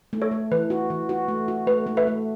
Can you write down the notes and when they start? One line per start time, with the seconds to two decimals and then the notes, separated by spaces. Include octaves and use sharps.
0.13 A3
0.22 A4 C#5
0.31 A3
0.51 E3 B4
0.70 F#4
0.90 E3
1.09 F#4
1.28 A3
1.48 F#4
1.67 A3 B4
1.87 A3
1.97 B4 E5
2.07 A3